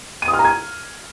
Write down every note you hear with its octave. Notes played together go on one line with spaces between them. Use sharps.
D#7
D#6
F6
A#5
G#6